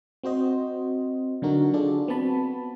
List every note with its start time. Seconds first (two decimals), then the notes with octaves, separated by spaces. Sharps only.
0.23 C4 F#4 C5 D#5
1.42 D3 F#3 D4 D#4 F#4 A#4
1.74 D4 F4 F#4 G#4 A4 D5
2.08 B3 C4 F#4 A5 B5